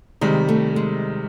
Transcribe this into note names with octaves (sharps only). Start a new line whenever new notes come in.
C3 D#3 G3 G#3
A3
G#3